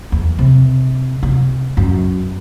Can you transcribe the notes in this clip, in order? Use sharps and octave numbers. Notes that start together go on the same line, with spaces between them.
E2
C3
C3
F#2